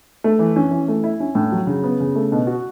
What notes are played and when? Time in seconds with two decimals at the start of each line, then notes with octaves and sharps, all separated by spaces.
0.24 A3
0.39 E3
0.56 C#4
0.71 E3
0.88 A3
1.04 E4
1.20 C#4
1.35 A2
1.52 F#3
1.67 C#3
1.84 B3
2.00 C#3
2.15 A3
2.32 B2
2.47 F#4